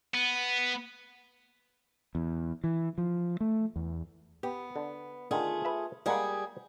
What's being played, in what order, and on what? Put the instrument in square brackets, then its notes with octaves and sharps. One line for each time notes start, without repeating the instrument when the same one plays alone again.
[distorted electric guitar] B3
[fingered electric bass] E2
E3
F3
A3
E2
[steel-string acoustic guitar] B3 [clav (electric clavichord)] G4
[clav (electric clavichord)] D3
[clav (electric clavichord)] D3 D#3 [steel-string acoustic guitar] A3 F4 G#4
[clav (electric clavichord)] B4 E5
[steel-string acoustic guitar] G3 G#4 [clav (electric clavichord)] G#3 A#3 F#5